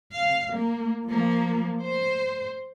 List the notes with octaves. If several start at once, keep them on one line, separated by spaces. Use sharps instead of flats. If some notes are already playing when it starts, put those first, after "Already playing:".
F5
A#3
F3 A#3
C5